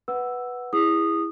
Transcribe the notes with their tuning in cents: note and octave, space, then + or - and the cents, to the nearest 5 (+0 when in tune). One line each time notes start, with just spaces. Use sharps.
B4 +0 F#5 +0 E6 +0
E4 +0 G#4 -20 D#6 -15